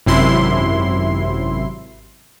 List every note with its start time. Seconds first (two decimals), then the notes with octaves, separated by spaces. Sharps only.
0.06 G#1 F#2 C3 E4 C6